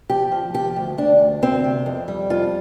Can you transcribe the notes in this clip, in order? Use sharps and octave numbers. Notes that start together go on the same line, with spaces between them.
F3 G4
F3
F3 G4
D2
D2 D4
D2
D2 C4
C3
F2
G3
F2 F4